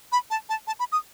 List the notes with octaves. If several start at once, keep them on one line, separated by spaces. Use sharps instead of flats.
B5
A5
A5
A5
B5
D#6